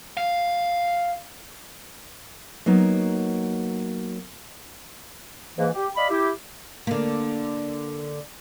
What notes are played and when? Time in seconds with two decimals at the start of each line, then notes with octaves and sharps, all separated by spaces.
0.17 F5
2.66 F#3 A#3 B3 D#4
5.57 G#2 E3 A#3
5.74 G4
5.96 D5 D#5 F5 B5
6.09 E4 G4
6.87 D3 A#3